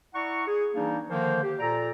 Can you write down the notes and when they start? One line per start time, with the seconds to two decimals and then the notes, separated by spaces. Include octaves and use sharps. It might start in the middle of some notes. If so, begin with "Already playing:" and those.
0.14 E4 D5 F#5 A#5 C#6
0.47 G#4
0.74 E3 G3 A#3 D4 D#4
1.09 D3 D#3 F3 A#3 C5
1.43 G4
1.59 A#2 A4 D5 A#5